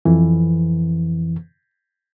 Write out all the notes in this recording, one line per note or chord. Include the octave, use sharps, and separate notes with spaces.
F2 E3